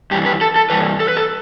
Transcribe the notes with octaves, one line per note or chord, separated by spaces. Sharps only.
G2 E3 G4
B4
A4
A4
G2 E3 B4
A4
B4
A4